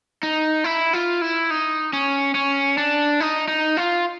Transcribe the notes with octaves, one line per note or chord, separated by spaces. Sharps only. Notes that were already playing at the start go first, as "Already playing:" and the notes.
D#4
E4
F4
E4
D#4
C#4
C#4
D4
D#4
D#4
F4